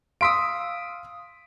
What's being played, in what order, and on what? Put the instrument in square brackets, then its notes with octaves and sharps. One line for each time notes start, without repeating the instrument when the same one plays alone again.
[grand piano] F5 C6 E6 [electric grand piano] D#6 B6 D7